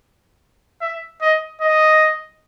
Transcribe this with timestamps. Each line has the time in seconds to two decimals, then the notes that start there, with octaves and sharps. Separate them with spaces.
0.81 E5
1.21 D#5
1.61 D#5